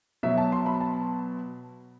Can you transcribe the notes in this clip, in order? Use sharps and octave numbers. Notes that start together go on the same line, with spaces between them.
B2 F#3 E5
A5
C6
B5
A5